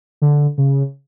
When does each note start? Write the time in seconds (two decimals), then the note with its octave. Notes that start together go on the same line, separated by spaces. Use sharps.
0.22 D3
0.58 C#3